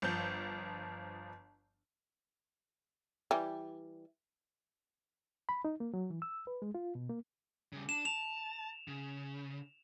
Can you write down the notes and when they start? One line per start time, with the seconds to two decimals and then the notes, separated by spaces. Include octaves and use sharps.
0.02 G1 F3 G6
3.31 E3 G3
5.49 B5
5.65 D#4
5.80 A#3
5.94 F#3
6.10 E3
6.22 E6
6.47 B4
6.62 G#3
6.75 F4
6.95 B2
7.10 A#3
7.73 C#3 G3
7.89 D4 E7
8.05 A5 F7
8.88 C#3